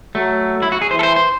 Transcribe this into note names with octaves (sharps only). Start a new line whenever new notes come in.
F#3 A3
E4
F#4
G#4
E3 C5
A4
C5
C5